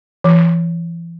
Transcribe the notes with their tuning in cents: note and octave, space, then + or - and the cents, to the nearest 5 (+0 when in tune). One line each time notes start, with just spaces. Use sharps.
E3 +35